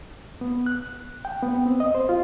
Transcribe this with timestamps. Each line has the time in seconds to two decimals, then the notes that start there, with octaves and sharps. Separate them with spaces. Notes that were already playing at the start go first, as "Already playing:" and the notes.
0.41 B3
0.66 F#6
1.25 G5
1.42 B3
1.66 C4
1.80 D#5
1.95 C5
2.09 F4